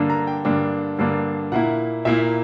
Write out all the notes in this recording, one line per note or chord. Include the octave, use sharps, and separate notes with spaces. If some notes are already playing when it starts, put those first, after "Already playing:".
Already playing: G2 D3 A#3 D4
A#5
G5
G2 D3 A#3 D4
G2 D3 A#3 D4
A#2 A#3 E4 F#5
A#2 A#3 E4 E5